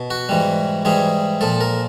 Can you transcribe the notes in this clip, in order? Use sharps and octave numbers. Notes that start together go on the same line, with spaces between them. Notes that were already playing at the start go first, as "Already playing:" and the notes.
Already playing: B2
F#4
G#2 E3 G3
G#2 E3 G3 G#4
A#2 F3 A4
A#4